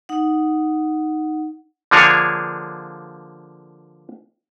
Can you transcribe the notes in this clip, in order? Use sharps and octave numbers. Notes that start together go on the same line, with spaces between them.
D#4 F#5
D3 F3 A#3 D4 G#4 C#5